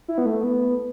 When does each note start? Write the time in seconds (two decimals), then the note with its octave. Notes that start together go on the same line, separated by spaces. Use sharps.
0.08 E4
0.18 B3
0.26 A3
0.44 B3